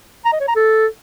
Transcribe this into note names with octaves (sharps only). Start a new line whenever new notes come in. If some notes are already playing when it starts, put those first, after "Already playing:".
A#5
D#5
C#5
A#5
A4